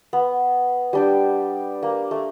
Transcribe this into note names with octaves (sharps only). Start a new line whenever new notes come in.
B3
G3 D4 G5
A#3
A3